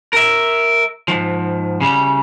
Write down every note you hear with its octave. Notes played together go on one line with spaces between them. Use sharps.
A#4 E5
G#2 F3
C#3 G3